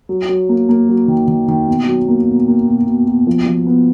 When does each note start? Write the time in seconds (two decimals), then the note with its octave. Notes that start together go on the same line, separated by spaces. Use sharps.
0.09 F#3
0.29 F#3
0.49 A#3
0.69 A#3
0.89 F#3
1.08 D#3
1.28 D#3
1.48 D#3
1.67 B2
1.87 F#3
2.08 A#3
2.27 B2
2.48 A#3
2.67 B2
2.87 B2
3.08 B2
3.27 F3
3.46 F3
3.66 B3